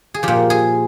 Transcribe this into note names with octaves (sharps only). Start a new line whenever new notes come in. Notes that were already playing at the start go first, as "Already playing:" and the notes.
G#4
A#2 F3 G4
G#4